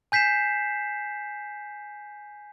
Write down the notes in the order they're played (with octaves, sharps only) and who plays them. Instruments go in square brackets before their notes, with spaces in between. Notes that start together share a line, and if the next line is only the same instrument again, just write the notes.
[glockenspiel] G#5 G6 B6 C7 E7